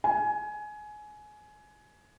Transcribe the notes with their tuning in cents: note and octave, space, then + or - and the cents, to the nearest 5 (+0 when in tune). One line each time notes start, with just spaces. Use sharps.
G#5 +20